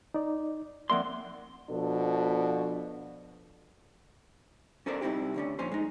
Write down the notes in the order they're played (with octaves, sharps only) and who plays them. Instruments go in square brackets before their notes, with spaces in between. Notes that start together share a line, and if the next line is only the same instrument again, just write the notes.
[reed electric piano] D#4 D5
[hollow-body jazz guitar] F2 A#3 C6 [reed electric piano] D5 E5 F#5
[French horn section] B2 F3 D4 A4
[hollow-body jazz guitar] C#4 A4 A#4 C5 D5
C2 C4 D#4 E4 G4
D2 D3 C#4
F2 A#2 C#4 C5
G#3 D#4